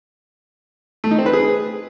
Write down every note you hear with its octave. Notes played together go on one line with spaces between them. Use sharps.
A3
D#4
C4
B4
G#4